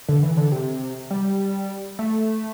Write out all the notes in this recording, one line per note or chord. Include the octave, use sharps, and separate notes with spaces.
D3
E3
D3
C3
G3
A3